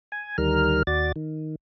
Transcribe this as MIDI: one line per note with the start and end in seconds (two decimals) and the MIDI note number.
0.12 0.37 80
0.38 0.83 38
0.38 0.83 51
0.38 0.83 55
0.38 0.83 70
0.38 0.83 89
0.87 1.12 39
0.87 1.12 66
0.87 1.12 74
0.87 1.12 93
1.16 1.55 51